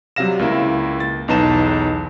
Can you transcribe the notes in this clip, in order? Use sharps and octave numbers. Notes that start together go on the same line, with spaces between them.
C3 F#3 G3 F5 A#6 E7
C#2 A#3 E4
A6
B1 E2 D#4 B4 A5 E7